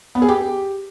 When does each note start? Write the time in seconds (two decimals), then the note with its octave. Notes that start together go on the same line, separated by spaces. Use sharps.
0.15 B3
0.22 G#4
0.29 G4